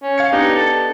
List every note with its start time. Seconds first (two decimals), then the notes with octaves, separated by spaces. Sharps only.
0.03 C#4
0.18 F5 G#6 C#7
0.32 B3 D4 D#4 G4
0.56 A4